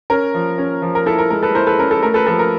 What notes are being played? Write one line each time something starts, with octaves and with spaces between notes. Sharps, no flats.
C#4 A#4
F3
C#4
F3
A#4
E4 A4
A#4
G#3 A#4
A4 B4
E4 A#4 C5
A4 B4
C#4 A#4
A4
A3 A#4
A4 B4
F3 A4
A#4